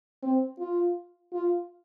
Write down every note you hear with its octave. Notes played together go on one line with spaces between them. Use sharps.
C4
F4
F4